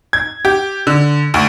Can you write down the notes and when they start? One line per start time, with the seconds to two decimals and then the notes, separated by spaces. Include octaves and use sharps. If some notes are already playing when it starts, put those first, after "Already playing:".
0.13 G#6
0.45 G4
0.87 D3
1.34 D2